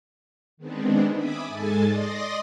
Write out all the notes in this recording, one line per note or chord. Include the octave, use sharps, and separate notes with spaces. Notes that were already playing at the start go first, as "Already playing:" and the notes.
D#3 G#3 B3 C4 D4
E5 G#5 B5 D6 D#6
G#2 G#3 A4 G#5 A5 A6
D5 D#5 C6 D#6 A#6